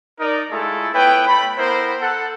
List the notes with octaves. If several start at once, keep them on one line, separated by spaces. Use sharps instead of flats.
D#4 A#4 D5
G#3 A3 E4 F4 G#4 A4
B3 E4 B4 C#5 G5
A3 B5
B3 E4 A#4 C5
A4 F#5